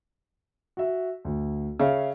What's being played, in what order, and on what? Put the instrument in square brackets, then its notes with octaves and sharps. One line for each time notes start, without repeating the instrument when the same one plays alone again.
[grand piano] F#4 E5
D2
[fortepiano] C#3 [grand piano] C#5 E5 F5